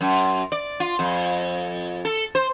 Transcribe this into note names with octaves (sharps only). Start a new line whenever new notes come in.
F#2
D5
F4
F2
A4
C5